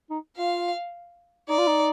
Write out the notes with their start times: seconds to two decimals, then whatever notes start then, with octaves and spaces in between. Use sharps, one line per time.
0.10 D#4
0.38 F4 F5
1.49 D#4 D5
1.58 F4
1.67 D#4